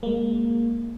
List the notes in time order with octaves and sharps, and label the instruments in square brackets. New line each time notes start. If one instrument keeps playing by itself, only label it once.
[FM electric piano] G#3 A#3